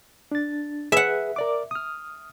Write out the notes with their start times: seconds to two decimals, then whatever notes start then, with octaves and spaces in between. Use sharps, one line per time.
0.32 D4 A6
0.92 G#4 B4 E5 F#5
1.36 A#4 D5 D6
1.71 D#6 F6